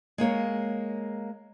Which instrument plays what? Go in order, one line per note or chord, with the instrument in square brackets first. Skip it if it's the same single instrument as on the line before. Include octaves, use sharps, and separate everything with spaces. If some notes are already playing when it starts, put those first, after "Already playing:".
[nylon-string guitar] G#3 A#3 C#5